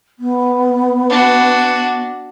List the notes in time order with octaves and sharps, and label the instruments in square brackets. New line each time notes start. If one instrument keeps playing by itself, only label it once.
[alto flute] B3
[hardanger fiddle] D4 F#4